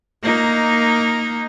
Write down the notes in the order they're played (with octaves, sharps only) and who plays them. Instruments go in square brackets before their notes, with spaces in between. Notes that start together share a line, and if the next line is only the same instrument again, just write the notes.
[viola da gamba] A#3 D#4